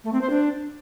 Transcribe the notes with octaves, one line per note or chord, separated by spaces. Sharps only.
A3
C4
C5
D4